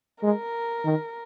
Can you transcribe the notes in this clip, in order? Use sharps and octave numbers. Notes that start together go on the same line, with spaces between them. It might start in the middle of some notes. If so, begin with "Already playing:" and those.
G#3 A#4
D#3